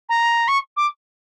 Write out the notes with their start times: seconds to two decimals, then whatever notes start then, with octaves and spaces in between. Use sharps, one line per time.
0.09 A#5
0.48 C#6
0.76 D6